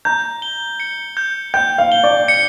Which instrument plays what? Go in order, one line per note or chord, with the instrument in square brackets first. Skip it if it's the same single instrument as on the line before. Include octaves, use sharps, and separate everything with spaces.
[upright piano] A#5 [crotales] G6
[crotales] G7
C#7
G6
[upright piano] G5 [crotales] G6
[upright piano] F5
[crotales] G7
[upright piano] D5
[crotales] C#7